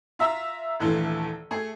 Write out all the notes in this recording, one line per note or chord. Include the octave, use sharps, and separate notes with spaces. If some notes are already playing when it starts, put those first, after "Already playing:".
F4 E5 A#5 E6
D#1 A#1 E3 A3 F4
A3 G#4